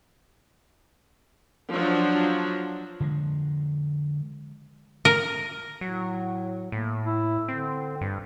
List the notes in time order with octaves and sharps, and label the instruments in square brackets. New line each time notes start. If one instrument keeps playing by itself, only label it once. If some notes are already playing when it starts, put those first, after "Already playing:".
[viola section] F3 F#3 D4
[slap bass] D3 F3 G3 G#3
[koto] A#4
[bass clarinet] A2 [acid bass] F#3
[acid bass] A2 [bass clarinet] A#3
[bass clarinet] E4
[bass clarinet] D3 [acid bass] C4
[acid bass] G2